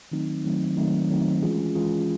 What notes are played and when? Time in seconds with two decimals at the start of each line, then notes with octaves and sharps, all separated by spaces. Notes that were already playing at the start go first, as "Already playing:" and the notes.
0.11 D#3 F#3 A3 C4 D#4
0.45 D#3 F#3 A3 C4 D#4
0.77 D#3 F#3 A3 C4 D#4
1.10 D#3 F#3 A3 C4 D#4
1.42 E3 G#3 C#4 F4 G#4
1.75 E3 G#3 C#4 F4 G#4